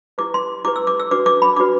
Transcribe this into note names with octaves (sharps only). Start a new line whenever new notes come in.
E4 G4 B4 D6
C6
E4 G4 B4 D6
E6
D6
E6
D4 F#4 B4 D6
D6
B5
D4 F#4 B4 D6